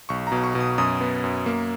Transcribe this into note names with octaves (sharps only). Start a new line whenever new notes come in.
B1 C#6
A#5
B2
C#6
B2
D#6
F#2 D#6
B3
F#2
A#3